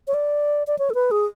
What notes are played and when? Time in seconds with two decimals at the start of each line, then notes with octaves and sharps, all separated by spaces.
0.07 C#5
0.14 D5
0.67 D5
0.78 C#5
0.90 A4
0.94 B4
1.11 G#4